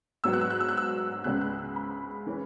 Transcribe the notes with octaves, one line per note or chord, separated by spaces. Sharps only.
G#2 F#3 B3 E6
F#6
E6
F#6
E6
F#6
E6
C#2 C#3 G#3 B3 F#6
F#6
E6
B5
E3 G#3 C#4